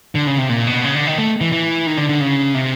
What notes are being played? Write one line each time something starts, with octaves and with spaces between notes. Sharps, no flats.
D3
C#3
C3
A#2
B2
C#3
D3
D#3
A3
E3
E3
D#3
D3
D3
C#3
C3